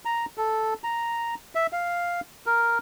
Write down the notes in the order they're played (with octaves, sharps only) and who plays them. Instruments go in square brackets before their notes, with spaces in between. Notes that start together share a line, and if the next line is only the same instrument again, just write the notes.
[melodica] A#5
A4
A#5
E5
F5
A#4